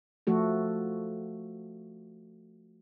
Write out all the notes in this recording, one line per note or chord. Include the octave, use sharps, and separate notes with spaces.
F3 A3 F#4 A4